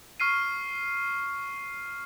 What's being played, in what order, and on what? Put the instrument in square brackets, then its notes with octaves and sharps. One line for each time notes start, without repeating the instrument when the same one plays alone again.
[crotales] C#6 F6 C7 D#7